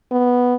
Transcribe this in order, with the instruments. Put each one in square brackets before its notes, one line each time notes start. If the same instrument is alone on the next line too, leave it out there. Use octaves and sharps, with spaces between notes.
[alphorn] B3